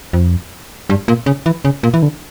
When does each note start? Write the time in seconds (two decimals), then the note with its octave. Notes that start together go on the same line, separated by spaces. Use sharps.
0.13 F2
0.90 G2
1.08 A#2
1.26 C#3
1.46 E3
1.65 C#3
1.83 A#2
1.94 E3
2.02 D3